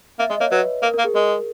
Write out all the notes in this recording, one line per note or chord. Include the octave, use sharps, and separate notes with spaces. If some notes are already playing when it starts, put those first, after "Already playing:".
A#3 E5
G#3 D#5
A#3 C#5
F#3 B4
A#3 A#4
A#4
A#3
G#4
G#3 A#4